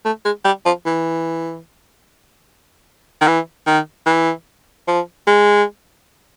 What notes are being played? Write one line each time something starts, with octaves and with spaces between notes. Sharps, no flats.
A3
G#3
G3
F3
E3
D#3
E3
D#3
E3
F3
G#3